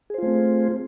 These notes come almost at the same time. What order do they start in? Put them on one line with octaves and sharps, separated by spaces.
G#4 C5 F4 A3 C4